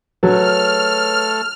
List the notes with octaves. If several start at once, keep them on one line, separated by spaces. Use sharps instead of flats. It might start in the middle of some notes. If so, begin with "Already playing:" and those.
F#3 A3 G#4 A4 B4 C#5 F6